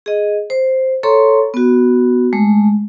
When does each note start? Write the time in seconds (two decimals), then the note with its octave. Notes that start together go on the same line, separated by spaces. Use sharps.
0.06 G#4 D#5
0.50 C5
1.03 A4 C#5 A#5 C6 C#6
1.54 B3 F#4
2.33 G#3 A3